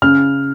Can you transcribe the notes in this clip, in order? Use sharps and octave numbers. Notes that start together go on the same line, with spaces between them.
C#3 F6